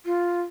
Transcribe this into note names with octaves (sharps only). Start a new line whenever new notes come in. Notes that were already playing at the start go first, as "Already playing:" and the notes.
F4